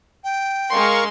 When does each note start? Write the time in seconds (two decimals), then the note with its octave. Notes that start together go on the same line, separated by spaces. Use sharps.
0.24 G5
0.70 G#3 A#4 F5 C6 C#6